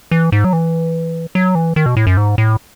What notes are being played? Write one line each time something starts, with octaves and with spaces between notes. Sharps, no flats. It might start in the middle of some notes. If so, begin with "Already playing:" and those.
E3
G#2
F#3
E3
F#3
E3
D#3
B2
A2
F#2
G#2
A2